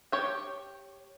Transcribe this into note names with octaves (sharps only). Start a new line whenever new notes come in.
G4 C#5 G5